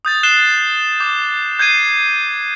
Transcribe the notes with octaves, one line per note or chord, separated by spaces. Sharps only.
D#6 G6 A6
F#6 C7 E7 G7
D6 G6
G6 G#6 C7 D#7